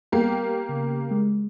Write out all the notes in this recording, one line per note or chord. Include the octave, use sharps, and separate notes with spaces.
G3 A#3 B3 G4
C#3
G#3